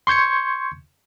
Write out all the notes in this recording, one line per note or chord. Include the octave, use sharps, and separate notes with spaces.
C6 C#6 G6 G#6 C#7